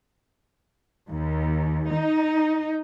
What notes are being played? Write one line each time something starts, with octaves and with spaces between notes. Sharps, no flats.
D#2
D#4